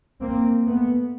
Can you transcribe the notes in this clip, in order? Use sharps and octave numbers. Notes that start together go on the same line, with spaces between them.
A#3 C4
A3 B3